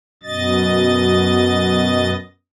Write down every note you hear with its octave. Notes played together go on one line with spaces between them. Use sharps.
F#2 B2 D#5 A6